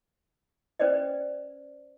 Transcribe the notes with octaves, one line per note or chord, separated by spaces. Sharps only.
C#4 B4 C5 D5 D#5